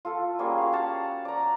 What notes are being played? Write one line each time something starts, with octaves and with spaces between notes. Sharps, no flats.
F4 A4
G3 A#3 C#4 G#4
F#4 F5
G4 F5 F#5 A5
D5 A#5